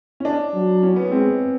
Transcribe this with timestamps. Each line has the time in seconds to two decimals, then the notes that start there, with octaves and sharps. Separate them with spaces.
0.20 C#4
0.25 D4
0.54 F#3
0.83 C#4
0.96 B3
1.11 G#3 C4